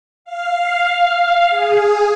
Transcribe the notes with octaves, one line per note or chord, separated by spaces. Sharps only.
F5
G#4